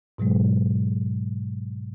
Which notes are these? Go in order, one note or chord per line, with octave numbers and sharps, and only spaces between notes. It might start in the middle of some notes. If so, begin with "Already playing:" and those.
G#2 B2 F#3 G#3